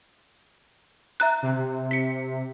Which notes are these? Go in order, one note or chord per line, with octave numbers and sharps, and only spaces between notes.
E5 A#5 F#6
C3
B6 C#7